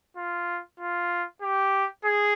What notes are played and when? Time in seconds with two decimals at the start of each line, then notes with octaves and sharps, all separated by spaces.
0.17 F4
0.80 F4
1.42 G4
2.04 G#4